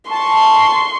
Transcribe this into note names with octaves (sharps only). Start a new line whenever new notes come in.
A5 C6 C#6